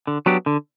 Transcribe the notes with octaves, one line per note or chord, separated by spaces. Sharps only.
D3
F#3 B3 D4 G4
D3